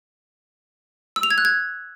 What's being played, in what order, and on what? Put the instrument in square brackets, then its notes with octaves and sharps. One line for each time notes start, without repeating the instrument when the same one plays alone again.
[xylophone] E6
F7
G#6
F#6
G#6